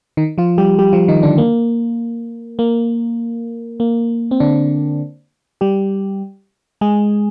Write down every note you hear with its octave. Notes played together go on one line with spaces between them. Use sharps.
D#3 D#4
F3 F4
G3 G4
G3 G4
F3 F4
D#3 D#4
D3 D4
A#3
A#3
A#3
C4
D3 D4
G3 G4
G#3 G#4